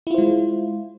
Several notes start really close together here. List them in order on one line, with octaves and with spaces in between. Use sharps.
E4 F4 C5 G#3